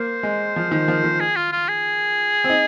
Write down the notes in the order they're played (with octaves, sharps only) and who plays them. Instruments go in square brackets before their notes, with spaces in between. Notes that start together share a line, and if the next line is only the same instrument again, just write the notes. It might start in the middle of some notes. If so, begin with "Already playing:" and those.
Already playing: [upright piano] A#3 [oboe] C5
[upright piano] G#3
F3
D#3
F3
D#3
[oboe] G#4
F4
F4
G#4
[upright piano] C4
D#4